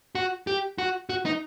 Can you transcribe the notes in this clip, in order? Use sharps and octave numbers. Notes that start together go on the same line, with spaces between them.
F#4
G4
F#4
F#4
D#4